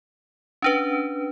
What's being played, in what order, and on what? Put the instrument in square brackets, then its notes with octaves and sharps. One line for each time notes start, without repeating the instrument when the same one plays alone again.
[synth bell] C#4 D4 B4